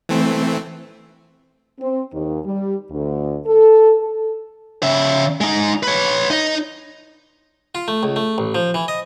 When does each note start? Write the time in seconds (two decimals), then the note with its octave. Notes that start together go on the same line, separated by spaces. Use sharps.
0.09 E3 A3 C4
1.80 C4
2.13 D#2
2.45 G3
2.91 D2
3.46 A4
3.99 A4
4.82 C#3 E5
5.41 G#3 D#4
5.83 B4 C#5
6.30 D#4 D#5
7.75 F4
7.88 A3
8.03 C#2
8.16 A3
8.38 A1
8.55 F3
8.74 E3
8.88 D#5